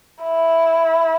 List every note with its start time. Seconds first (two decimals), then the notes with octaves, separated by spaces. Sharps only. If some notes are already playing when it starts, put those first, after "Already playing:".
0.23 E4